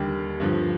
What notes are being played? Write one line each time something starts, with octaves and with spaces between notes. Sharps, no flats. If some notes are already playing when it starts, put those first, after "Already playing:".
Already playing: D#2 D3 G3
G2 D3 F3